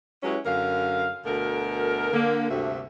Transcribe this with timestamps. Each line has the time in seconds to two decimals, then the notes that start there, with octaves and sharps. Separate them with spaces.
0.23 F#3 G#3 C#4 E4 G4 B4
0.45 F#2 D3 A#4 F5
1.25 D2 B2 A4 A#4
2.12 D3 A#3
2.49 D2 G2 C3 A3 F#4 E5